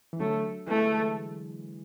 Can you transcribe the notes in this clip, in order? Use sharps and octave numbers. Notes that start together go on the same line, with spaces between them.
E3
D3 F#3 A3
E3 G#3 A3